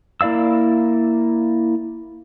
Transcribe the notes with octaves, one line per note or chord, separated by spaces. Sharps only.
A#3 E4 D5 F5 E6